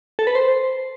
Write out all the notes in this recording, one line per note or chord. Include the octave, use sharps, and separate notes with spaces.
A4
B4
C5